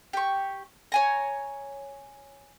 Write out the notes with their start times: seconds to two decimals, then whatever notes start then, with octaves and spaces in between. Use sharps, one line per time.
0.13 G4 C#6
0.92 C#5 G#5 A#5